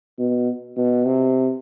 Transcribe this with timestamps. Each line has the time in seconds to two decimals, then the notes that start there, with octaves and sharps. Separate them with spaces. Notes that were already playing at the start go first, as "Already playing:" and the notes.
0.19 B2
0.77 B2
1.06 C3